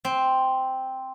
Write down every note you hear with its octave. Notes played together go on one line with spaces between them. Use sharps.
C4